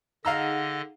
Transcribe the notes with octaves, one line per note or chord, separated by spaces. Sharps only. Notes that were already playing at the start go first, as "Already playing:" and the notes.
D3 D#4 G#4 D#5 F5 F#5 A#5 E6